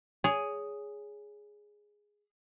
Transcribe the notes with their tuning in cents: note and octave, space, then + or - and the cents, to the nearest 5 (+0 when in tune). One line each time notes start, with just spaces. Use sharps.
G#4 +0 C#5 +25